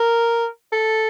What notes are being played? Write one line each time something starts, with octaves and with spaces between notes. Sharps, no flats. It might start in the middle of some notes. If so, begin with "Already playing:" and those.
Already playing: A#4
A4